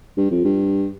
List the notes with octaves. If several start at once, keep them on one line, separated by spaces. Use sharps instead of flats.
G2
F2
G2